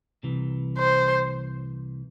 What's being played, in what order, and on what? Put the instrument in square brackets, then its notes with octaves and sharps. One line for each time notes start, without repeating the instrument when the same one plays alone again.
[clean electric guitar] C2 C3 E3
[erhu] C5